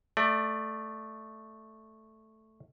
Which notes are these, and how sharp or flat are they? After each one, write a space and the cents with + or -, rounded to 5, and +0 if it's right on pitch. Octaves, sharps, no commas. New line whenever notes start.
A3 +0 D5 +20